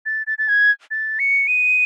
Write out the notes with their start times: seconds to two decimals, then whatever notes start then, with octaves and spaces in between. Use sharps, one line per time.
0.06 A6
0.27 A6
0.38 A6
0.48 G#6
0.91 A6
1.19 C#7
1.47 D#7